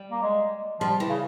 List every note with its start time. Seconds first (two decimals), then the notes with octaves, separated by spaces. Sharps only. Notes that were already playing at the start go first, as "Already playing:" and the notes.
Already playing: G3
0.11 A#3
0.22 G#3
0.80 F3 G3
1.00 E3
1.10 C#3